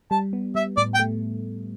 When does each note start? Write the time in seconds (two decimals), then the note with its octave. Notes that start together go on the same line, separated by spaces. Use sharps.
0.11 G3 A5
0.33 B3
0.55 G3 E5
0.77 A2 D5
0.94 G5
0.99 A3